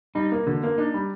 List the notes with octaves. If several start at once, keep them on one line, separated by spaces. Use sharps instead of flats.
G3 D#4
A#3
D3
A#3
D4 D#4
G3